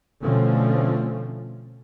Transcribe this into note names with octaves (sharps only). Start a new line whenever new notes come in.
B2 D3 F3 A3 C4 C#4